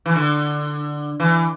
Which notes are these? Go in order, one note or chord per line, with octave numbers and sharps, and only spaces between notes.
E3
D3
E3